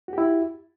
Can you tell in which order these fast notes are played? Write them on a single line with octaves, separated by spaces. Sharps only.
F#4 G4 E4